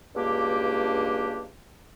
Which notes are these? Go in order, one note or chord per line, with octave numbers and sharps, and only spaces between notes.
C#2 G2 B2 A#3 D4 G4